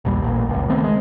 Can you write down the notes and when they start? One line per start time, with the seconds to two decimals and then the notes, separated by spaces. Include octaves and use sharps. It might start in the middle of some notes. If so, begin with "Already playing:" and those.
0.05 A#1 D#2 G3
0.22 A1 A#2
0.49 F#1 C#2
0.69 D#3 A3 B3 C4
0.84 G#3